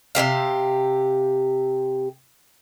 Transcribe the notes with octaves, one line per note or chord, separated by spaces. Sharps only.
C3 A#3 G4 F5